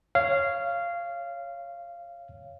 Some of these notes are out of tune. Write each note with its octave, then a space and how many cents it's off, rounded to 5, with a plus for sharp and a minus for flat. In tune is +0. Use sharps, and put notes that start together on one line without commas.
C#5 +0 F5 -15